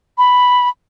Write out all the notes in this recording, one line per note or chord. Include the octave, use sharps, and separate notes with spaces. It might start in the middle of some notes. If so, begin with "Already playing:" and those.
B5